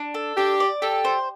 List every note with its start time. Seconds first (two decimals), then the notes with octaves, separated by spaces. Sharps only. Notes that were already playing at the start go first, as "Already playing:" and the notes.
Already playing: D4
0.14 A4
0.37 D4 G4
0.60 D5
0.82 G4 A4
1.05 C5